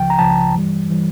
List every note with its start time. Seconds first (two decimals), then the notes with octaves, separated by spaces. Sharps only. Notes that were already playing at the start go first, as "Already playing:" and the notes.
Already playing: C#2 C#3 F3 G5
0.10 A#5
0.19 C#2 C#3 F3 A5
0.54 G2 E3 G3
0.90 E3 G3